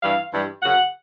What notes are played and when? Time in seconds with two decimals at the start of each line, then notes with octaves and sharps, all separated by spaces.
0.03 G2 E3 G3 F5
0.32 G2 E3 G3
0.62 F#2 C#3 F#3 F#5